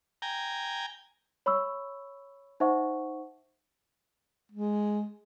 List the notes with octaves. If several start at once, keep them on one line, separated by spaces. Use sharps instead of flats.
G5 G#5 A#5
C#5 B5 C#6 E6
D#4 C5 E5 F#5 C#6
G#3